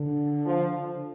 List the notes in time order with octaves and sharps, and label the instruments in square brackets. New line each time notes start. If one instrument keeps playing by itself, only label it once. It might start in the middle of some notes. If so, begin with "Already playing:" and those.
Already playing: [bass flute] D3
[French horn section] F3